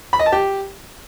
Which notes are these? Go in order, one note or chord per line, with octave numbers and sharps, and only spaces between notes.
B5
D#5
A5
G4